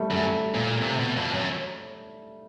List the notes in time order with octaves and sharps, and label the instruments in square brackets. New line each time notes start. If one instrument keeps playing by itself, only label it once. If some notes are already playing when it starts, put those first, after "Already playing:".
Already playing: [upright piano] G3 A3
[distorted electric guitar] F#2 [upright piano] G3 A3
[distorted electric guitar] A#2
C3
B2
F2
F#2